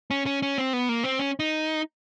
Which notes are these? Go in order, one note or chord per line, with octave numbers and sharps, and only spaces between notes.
C#4
C#4
C#4
C4
B3
A#3
C4
C#4
D#4